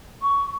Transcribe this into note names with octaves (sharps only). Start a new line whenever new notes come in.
C#6